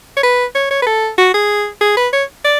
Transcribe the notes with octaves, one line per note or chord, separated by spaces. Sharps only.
C#5
B4
C#5
C#5
B4
A4
F#4
G#4
G#4
B4
C#5
D5